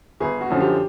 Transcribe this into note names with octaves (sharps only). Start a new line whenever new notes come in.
G1 G#4
F#4
F#2 D3 F3
G4